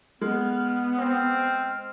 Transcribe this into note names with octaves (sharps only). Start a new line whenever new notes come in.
G#3 B3 F6
C4 F6